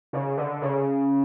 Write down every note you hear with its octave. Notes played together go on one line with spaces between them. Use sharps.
C#3
D3
C#3